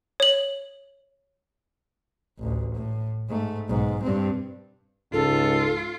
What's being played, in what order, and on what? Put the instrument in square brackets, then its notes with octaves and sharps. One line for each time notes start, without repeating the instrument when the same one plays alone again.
[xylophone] C#5 F#7
[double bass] A1 D2
A2
G#2 A3
B1 G#2
G2 C4
[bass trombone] C#2 [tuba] G#2 [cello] F4 [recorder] A4